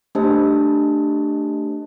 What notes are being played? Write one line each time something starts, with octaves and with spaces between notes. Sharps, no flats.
A3 D4 G4 C5 D#5 A5